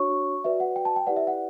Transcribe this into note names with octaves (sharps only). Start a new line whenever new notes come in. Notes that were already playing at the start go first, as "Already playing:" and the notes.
Already playing: D4 F#4 C#5 C#6
F#4 B4 D5 E5
F#5
G5
A5
G5
E4 G4 B4 D5 F#5
E5
F#5